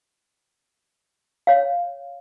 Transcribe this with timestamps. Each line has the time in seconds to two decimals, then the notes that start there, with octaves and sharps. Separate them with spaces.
1.47 C#5 F5